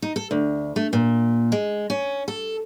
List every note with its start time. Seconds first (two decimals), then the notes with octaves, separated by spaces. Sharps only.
0.02 D#4
0.16 A4
0.31 D2
0.76 A3
0.93 A#2
1.52 G#3
1.90 C#4
2.28 A4